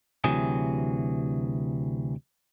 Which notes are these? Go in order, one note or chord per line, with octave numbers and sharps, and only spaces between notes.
D2 C3 E3 F#3 G#4